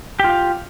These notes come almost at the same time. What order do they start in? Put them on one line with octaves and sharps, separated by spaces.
G4 F4 F5